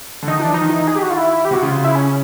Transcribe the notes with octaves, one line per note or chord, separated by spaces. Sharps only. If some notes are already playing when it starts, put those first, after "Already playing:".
D3
D#3 D#4
E3 D4
F3
D#4
D#3
E3
D#3
G#4
G4
F#4
F4
E4
G4
C3 F#4
C#3 F4
E4
C#4